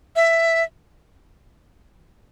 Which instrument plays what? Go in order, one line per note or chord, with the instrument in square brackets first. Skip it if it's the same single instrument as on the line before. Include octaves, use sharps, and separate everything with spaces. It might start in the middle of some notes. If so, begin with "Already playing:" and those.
[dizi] E5